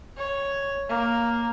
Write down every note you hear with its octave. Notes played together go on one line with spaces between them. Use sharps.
C#5
A#3